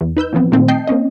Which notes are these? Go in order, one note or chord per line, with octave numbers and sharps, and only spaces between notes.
E2
D#4 B4 E6 G6
A#2 E3 F3 B3 C4
A#2 D#3 A3 C4
D#5 G5 A5 G6 C7
A#3 C4 C#4 D#5